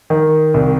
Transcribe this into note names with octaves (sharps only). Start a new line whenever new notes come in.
D#3
C2